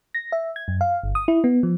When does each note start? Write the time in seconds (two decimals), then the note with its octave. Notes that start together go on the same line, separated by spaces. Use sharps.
0.14 A#6
0.32 E5
0.56 G#6
0.68 F#2
0.81 F5
1.03 G1
1.15 D#6
1.28 E4
1.44 B3
1.63 F3